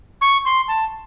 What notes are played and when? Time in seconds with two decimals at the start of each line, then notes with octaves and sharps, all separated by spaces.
0.21 C#6
0.45 C6
0.68 A5